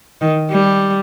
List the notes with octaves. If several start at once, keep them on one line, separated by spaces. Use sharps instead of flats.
D#3
G3